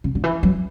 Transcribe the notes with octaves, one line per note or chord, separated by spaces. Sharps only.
C#3
D3
E3
F#3